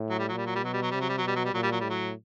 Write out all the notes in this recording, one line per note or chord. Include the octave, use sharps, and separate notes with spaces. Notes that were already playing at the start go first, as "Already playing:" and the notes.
Already playing: A2
F#3
G3
F#3
A#2 G3
F#3
G3
B2 F#3
G3
F#3
C3 G3
F#3
G3
F#3
B2 G3
F#3
G3
A#2 F#3
G3
F#3
A2 G3
F#3